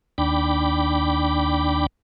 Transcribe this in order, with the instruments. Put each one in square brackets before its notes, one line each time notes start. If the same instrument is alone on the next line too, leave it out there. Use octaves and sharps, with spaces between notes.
[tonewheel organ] D#2 D4 G5 B5 D6